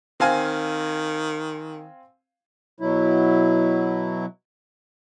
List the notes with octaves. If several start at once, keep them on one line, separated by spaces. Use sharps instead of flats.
D#3 C4 F5 G#5
B2 F#3 E4